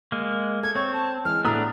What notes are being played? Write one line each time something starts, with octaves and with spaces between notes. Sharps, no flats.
G#3 A#3
A4 G#6
C4 C#5 C#6
A5
E3 G#3 F6
A2 A3 B3 D4 A#5 D#6